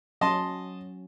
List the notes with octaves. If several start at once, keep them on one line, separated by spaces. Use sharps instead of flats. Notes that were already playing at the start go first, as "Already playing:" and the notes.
F#3 C#4 D#5 A5 C6